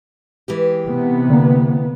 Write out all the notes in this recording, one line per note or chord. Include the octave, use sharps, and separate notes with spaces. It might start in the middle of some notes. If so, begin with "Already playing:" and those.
E3 G#3 G4
C3 B3
D3 A#3